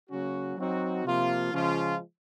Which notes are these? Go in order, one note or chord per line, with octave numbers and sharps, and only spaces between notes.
C#3 F#3 A#3 C#4 F#4
F#3 C4 D#4 F#4
C3 F3 A#3 F4
C#3 F3 G#3 C#4 F4